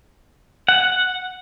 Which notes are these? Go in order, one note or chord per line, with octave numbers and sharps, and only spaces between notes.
F#5